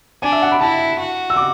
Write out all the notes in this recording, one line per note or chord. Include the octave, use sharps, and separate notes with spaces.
D4 G#5
E5
F#5
B5
E4 A5
F#4
E6
D6